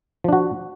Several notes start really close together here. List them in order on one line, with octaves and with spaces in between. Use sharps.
F3 D4 F#4